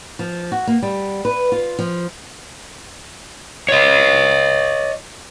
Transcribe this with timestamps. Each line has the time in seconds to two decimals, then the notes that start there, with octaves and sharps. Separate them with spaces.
0.19 F3
0.52 F#4
0.67 A#3
0.82 G3
1.25 B4
1.52 F4
1.79 F3
3.69 C#5 D#5